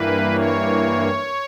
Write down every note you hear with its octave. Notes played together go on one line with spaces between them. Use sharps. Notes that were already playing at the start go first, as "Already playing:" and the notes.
Already playing: G2 E3 A#3 B4
C#5